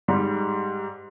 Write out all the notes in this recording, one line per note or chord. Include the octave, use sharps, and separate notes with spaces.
G#2 G3